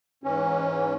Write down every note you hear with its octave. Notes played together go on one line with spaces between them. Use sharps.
G#2 E3 C#4